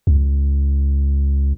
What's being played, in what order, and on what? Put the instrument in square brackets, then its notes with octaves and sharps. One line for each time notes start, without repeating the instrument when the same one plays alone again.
[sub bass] C#2